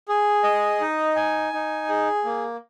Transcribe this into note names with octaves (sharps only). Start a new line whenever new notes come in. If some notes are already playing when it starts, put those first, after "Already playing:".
G#4
D#5
D#4
G#5
D#4
G#4
A#3